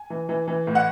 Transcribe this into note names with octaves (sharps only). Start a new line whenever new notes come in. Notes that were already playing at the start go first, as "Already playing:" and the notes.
Already playing: G#5
E3
E3
E3
A2
F#5